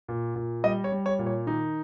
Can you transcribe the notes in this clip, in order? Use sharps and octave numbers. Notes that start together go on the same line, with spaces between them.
A#2
A#2
G3 D#5
C#5
G3
C#5
A#2
C#5
D#3 D#4